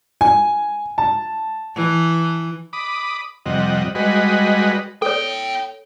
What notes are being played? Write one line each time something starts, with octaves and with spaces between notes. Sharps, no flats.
G#5
A5
E3
B5 D6 D#6
F2 C3 G3 D#5 F#5
G3 G#3 F#4 B4 D#5
E4 A4 C#5 G5